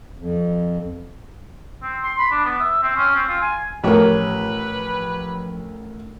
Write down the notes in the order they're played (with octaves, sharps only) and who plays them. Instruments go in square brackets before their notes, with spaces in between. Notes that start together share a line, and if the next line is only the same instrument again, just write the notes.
[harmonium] F2
[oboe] C4
C6
B5
D4
B3
E5
C4
C#4
C4
F4
G#5
[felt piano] A1 A#4 [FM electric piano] F3 [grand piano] G4 C#5 [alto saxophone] B4